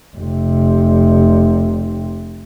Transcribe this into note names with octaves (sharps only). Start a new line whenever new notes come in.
F1 C3